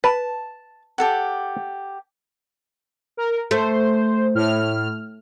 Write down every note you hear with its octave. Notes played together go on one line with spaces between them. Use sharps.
B4 A5
G4 A4 F#5
A#4
A3 C5
A2 F6